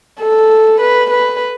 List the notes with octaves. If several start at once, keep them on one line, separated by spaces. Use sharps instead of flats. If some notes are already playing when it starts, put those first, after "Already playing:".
A4
B4
B4